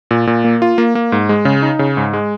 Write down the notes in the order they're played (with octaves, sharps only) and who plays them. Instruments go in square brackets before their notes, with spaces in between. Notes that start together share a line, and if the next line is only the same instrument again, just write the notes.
[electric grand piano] A#2
A#2
A#3
F4
A#3
A#3
G#2
G#3
C#3
D#4
C#3
G#2
G#3